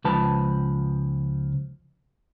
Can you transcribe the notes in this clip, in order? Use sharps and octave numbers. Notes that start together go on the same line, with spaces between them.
C#2 F3 B4 A5